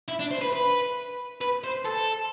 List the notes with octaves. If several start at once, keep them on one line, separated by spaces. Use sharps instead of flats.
E4
D4
C5
B4
B4
B4
C5
A4